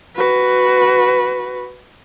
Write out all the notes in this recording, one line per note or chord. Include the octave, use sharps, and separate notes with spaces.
F#4 B4